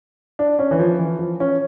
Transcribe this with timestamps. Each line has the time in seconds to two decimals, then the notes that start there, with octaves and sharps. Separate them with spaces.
0.39 D4
0.59 C#4
0.71 E3
0.79 F3
0.99 E3
1.19 F3
1.40 C#4